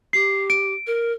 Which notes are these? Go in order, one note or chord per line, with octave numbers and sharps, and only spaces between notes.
G4 C7
D7
A#4